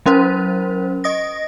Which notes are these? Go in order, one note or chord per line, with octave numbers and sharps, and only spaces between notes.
F#3 C#4 A#4 C5
D#5 D#6 A#6